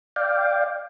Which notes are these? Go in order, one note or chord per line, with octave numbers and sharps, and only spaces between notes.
D5 F5 G5